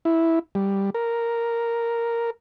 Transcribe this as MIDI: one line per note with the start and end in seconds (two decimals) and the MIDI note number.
0.05 0.39 64
0.55 0.90 55
0.94 2.30 70